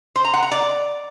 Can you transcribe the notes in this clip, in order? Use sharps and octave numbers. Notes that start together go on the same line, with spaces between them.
C5
A#5
F#5
A#5
D5